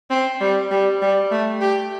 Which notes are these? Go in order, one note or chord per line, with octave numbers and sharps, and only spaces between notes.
C4
G3
G3
G3
A3
G4